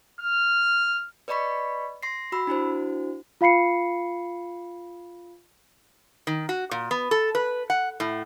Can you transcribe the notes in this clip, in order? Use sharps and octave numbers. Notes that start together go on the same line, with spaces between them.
F6
B4 D5 D#5 B5 C#6 B6
C6 A#6 C7
F#4 B5 E6
D4 E4 F#4 C5
F4 F5 B5 C7 C#7
D#3
F#4
A#2
B3
A4
B4
F#5
A2